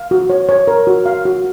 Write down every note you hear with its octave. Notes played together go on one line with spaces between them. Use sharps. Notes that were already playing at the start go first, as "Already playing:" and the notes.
Already playing: F5
F#4
C#5
C#5
A#4
F#4
F5
F#4